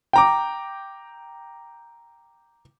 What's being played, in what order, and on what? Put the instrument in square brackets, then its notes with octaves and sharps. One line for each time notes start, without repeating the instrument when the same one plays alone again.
[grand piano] G5 A#5 D6